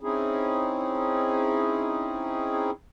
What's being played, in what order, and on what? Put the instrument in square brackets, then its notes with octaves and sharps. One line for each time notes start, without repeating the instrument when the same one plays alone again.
[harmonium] C4 C#4 D#4 E4 G#4